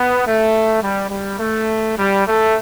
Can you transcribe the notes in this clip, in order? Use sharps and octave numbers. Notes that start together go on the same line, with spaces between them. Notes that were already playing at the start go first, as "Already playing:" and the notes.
Already playing: B3
A3
G3
G3
A3
G3
A3